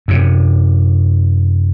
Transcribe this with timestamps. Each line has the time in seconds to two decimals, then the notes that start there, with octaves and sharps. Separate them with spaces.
0.08 F#2 C3